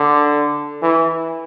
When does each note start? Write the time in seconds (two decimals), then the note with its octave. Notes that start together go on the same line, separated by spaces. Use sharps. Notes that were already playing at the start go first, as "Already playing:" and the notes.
Already playing: D3
0.82 E3